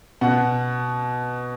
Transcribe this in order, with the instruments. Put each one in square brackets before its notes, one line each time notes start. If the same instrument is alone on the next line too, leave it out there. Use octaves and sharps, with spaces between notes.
[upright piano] B2 F#5